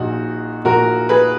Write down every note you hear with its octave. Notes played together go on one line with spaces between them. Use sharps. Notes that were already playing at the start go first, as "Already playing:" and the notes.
Already playing: A#1 A#2 D#4 F#4
A#1 A#2 F#4 A#4
G#4 B4